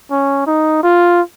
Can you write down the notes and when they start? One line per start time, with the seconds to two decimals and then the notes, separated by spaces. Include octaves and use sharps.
0.11 C#4
0.47 D#4
0.83 F4